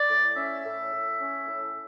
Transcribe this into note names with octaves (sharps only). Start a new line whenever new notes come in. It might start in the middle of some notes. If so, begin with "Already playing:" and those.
Already playing: D5
A2
C#4 E5
A2
A2
C#4
A2